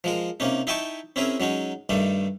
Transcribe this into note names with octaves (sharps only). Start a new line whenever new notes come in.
F3 G#3 A#4
C3 A#3 C#4 D#4
D#4 E4 D#5 G5 A5 C#6
C4 C#4 E4 G#4 A#4
F#3 G#3 C#4 D#4
G2 D#3 G3 A3